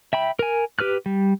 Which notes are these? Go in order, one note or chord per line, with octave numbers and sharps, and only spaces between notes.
E5 G5 B5
A#4 G#5
G4 B4 F6 F#6
G3